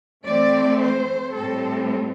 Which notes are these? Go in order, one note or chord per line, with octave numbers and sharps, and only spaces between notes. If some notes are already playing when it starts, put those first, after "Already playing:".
E3 A3 C4 D5
C5
A2 G3 C4 A4